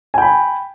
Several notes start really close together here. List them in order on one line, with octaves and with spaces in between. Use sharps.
G#5 G5 B5